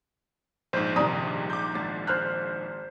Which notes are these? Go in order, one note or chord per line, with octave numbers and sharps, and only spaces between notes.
A#1 G#2 C5
G2 C3 D#3 D5 A#5 D#6
D6 G6
G#1 A6
C5 F6 F#6